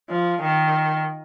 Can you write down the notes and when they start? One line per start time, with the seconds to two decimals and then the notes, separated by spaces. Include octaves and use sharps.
0.10 F3
0.42 D#3